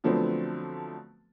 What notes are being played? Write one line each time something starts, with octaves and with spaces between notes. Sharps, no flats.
D3 F3 F#3 A3 B3 C4